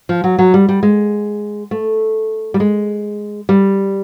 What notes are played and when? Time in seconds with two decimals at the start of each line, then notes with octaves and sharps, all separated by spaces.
0.09 F3
0.24 F#3
0.39 F#3
0.54 G3
0.69 G3
0.83 G#3
1.71 A3
2.54 G3
2.60 G#3
3.49 G3